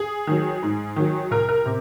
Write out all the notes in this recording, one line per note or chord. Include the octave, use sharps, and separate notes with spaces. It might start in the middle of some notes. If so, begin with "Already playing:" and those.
Already playing: G#4
D#3 F#3
G#2
D#3 F#3
C2 A#4
A#4
C3